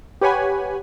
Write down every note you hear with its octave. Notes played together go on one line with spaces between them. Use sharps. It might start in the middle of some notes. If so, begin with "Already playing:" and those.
G4 B4 C#5 F#5 G#5 B5